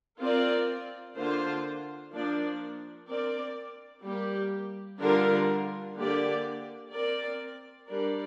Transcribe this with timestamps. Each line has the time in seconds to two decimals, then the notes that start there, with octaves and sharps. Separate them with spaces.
0.20 C4 F4 A#4 D5
1.16 D3 A#3 F4 C5
2.12 F3 A#3 D4 A#4 D5
3.08 C4 A#4 D5
4.04 G3 A#3 G4
5.00 D3 G3 D4 F4 A#4
5.96 D3 A#3 G4 D5
6.92 C4 A#4 D5
7.88 G3 D4 A#4 D5